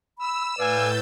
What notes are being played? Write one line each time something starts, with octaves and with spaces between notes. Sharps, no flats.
B5 E6
A2 B4 D5 F5 G#5 G6 A6